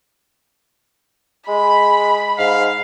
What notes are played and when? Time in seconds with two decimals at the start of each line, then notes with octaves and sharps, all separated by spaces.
1.48 G#3 B5
2.38 G#2 F5